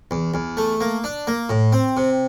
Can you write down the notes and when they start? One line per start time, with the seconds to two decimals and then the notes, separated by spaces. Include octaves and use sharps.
0.11 E2
0.34 E2
0.57 A3
0.81 A#3
1.04 D4
1.27 A#3
1.49 A2
1.73 C4
1.97 C3